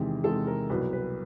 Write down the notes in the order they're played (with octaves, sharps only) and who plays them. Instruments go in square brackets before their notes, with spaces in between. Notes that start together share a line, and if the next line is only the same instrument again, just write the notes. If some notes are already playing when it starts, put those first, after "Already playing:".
Already playing: [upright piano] E2 C3 D#3 G#3
E2 C3 D#3 G#3 A4
A#4
C2 B2 F#3 B4
B4